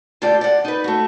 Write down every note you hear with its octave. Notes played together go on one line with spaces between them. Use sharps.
D3 A3 F4 G4 D5
D5 F#5
D#4 B4
A3 F#4